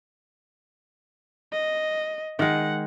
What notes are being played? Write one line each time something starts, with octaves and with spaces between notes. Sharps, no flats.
D#5
D#3 G#3 F#5